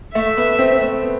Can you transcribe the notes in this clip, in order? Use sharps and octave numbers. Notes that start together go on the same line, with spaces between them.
A3 E5
B3
C4
A3
B3